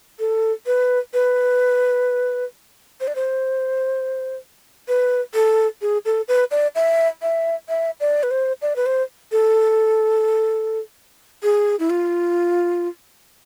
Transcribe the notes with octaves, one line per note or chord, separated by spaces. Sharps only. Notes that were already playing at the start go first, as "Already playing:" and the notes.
A4
B4
B4
C5
D5
C5
B4
A4
G#4
A4
B4
D5
E5
E5
E5
D5
B4
C5
D5
B4
C5
A4
G#4
E4
F4